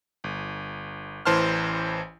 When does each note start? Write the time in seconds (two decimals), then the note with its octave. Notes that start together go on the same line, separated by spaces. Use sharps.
0.24 G1
1.25 A1 E3 C5 A5 C6 F6